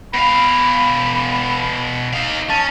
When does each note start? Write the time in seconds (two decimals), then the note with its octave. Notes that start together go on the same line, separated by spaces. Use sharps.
0.14 B2 F5 B5
2.13 D#4 F5
2.50 C#4 A5